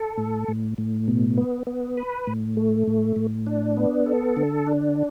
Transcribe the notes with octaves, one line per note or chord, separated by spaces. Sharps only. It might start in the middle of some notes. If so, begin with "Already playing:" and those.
Already playing: A4
A2
A2
A2
B2
B3
B3
B4
A2
A3
A2
A2
D4
B3
A4
D3
D4